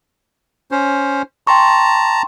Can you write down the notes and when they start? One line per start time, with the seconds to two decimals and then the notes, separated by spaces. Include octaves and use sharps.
0.71 C#4 C5
1.47 G5 A5 A#5 C6 C#6